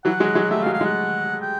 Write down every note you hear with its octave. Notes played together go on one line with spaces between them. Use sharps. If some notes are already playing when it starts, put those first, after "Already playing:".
E3 F#3 F#5
F#3 G#3
F#3 G#3
G3 A3 E5
F5
F#3 G#3
F5
F#3 G#3
F#5
G5